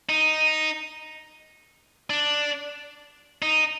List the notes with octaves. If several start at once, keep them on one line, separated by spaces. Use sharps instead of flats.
D#4
D4
D#4